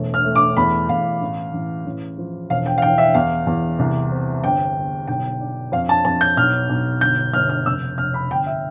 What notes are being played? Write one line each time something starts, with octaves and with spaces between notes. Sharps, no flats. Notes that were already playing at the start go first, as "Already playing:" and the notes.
Already playing: E1 A3
F6
A3
D6
E2 B5
E2 F5
A1
A1
A1
F3
E1 F5
G5
F5
E3 G5
E5
E2 F5
E2
C2
C4
G1 G5
G1
B1 G5
D4
F2 F5
A5
F2 A5
G6
B1 F6
B1
G1 G6
G1 F6
F6
F1 E6
F1 F6
B5
G1 G5
E5